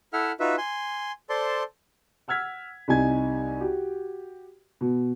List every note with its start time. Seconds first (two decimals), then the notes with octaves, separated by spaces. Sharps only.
0.13 E4 A4 E5 F#5 F6
0.40 D#4 F4 F#4 B4 E5
0.58 G#5 C6
1.30 A4 C5 D5 A5 C6
2.28 F#5 E6 F6 G#6 B6
2.88 C2 C3 D#4 G#5 G#6
3.61 F#4 G4
4.81 B2